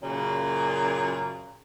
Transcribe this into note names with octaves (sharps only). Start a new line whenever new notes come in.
F#2 A#2 C#3